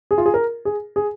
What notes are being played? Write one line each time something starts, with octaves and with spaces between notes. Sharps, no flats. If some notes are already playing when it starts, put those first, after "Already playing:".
G#4
F4
G#4
A#4
G#4
G#4